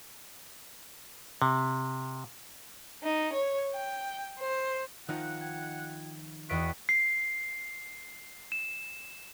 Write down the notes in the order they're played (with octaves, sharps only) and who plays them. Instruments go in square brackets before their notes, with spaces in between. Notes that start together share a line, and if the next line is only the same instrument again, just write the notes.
[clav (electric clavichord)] C3
[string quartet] D#4
C#5
G5
C5
[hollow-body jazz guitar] D#3 F3 D#4 [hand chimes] F4 F#6 [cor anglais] F#5
[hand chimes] F4 G5 G#6
[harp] E2 D#5 D7 [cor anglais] F#4 [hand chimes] G5 B6
[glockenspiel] C7
E7